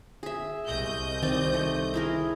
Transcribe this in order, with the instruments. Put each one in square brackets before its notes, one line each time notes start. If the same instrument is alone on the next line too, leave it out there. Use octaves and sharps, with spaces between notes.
[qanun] G#4 E5
[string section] C2 D#5 G6
[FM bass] D#3 [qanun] C4 D5
[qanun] A3
E4 G#4 A#4